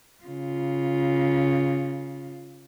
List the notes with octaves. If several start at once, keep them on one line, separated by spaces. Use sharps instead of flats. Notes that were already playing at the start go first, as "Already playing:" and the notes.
C#3 F4